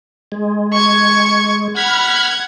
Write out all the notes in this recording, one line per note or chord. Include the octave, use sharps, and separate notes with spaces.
G#3
C#6 G#6
F#5 B5 F6 G#6